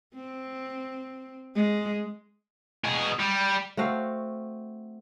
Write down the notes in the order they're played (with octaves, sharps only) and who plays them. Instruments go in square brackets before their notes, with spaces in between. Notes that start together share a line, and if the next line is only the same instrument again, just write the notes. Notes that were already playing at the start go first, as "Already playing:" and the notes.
[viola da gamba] C4
G#3
[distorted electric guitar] B2 G#4
G3
[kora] A3 C4 F#4 F5